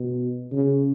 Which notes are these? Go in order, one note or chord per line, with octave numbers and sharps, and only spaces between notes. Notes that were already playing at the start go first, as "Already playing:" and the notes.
Already playing: B2
C#3